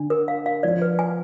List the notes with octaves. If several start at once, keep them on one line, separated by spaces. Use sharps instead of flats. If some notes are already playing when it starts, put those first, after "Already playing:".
Already playing: D3 D4
A#4
F5
F5
F3 D5
B4
G#5